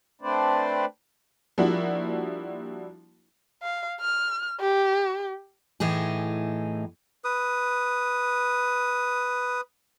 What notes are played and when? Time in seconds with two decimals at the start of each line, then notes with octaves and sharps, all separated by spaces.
0.21 A3 C4 D4 B4 C5 D5
1.58 F3 G3 A#3 D4 E4 F#4
3.63 F5
4.01 F6
4.61 G4
5.80 A2 E3 D#4 G#4
7.24 B4 D#6